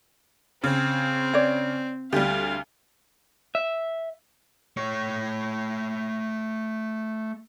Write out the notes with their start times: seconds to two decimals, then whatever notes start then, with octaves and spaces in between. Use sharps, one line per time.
0.64 C#3 C4
1.34 C#5 D5
2.13 D2 G3 G4 F5
3.55 E5
4.77 A3 C#5